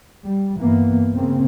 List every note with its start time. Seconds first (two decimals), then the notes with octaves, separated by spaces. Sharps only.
0.23 G3
0.59 G2 E3 A#3 B3
1.14 C#3 A#3 C4